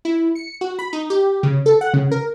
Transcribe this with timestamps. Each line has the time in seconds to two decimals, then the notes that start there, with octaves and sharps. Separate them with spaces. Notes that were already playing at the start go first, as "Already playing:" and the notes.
0.05 E4
0.35 C#7
0.61 F#4
0.79 B5
0.93 D#4
1.10 G4
1.43 C#3
1.66 A4
1.81 F#5
1.94 C#3
2.11 A#4